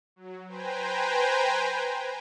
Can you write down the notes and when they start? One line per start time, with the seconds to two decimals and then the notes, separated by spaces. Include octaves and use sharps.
0.16 F#3
0.47 B4 C5 G5 G#5 A#5